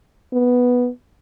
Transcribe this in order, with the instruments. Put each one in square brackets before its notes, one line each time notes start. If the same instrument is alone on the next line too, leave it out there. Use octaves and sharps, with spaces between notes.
[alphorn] B3